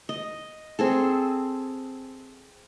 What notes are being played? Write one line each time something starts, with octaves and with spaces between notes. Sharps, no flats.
D#5
C4 G#4 A4